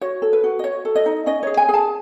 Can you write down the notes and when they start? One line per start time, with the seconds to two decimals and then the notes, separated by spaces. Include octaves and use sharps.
0.01 F#4 C#5
0.22 A4
0.33 B4
0.44 F#4
0.59 D#5
0.64 F#4 C#5
0.85 A4
0.96 D#5
1.06 D#4
1.26 C#4 D#5
1.43 G#4 C#5
1.57 G#5
1.69 G#4
1.74 A5